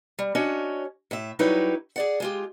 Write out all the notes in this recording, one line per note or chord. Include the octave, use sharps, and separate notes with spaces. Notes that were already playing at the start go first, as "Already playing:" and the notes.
G3
C#4 D4 F#4 C#5 D#5
A2 E5
F#3 G3 D#4 E4 B4 C#5
G#4 D5 F#5
G#3 F4 G4